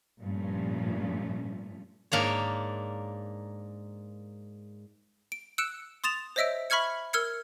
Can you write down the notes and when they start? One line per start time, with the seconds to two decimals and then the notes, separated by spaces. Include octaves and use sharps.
0.21 G2 A#2 F3 A3 C#4
2.12 G#2 A#3 D4 C#5
5.32 D7
5.58 E6 F#6 C#7 D7 E7
6.04 C6 D#6 A6 E7 F7
6.36 C5 C#5 D#5 E5 E6 D7
6.70 E5 B5 C#6 F6 G#6 C#7
7.13 A#4 E6 F6 G#6 C#7